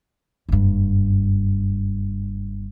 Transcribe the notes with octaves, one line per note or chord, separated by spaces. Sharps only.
F#1 G2